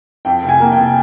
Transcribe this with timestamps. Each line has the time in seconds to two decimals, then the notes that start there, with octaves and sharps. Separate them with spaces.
0.25 F2 G5
0.43 F1
0.49 G#5
0.60 A#3
0.72 G5
0.77 F1